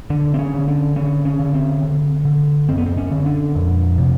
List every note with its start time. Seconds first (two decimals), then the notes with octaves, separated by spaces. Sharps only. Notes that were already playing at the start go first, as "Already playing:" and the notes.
0.10 D3 D4
0.34 C4
0.39 C#4
0.54 D3
0.68 D4
0.96 D3 C#4
1.25 C#4
1.40 D3
1.54 C4
1.83 D3
2.25 D3
2.69 F#2 C4
2.78 B3
2.86 C4
2.97 C#4
3.11 D3
3.26 D4
3.55 F2
3.98 C3